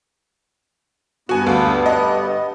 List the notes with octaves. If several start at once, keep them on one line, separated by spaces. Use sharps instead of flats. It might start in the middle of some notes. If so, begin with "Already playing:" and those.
G2 B3 F#4 G#5
D2 F5
D#5